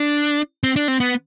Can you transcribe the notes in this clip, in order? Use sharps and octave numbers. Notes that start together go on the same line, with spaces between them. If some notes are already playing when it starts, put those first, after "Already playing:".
Already playing: D4
C4
D4
C4
B3